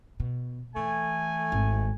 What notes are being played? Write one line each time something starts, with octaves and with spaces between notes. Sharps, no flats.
B2
E3 A3 G#5
G#1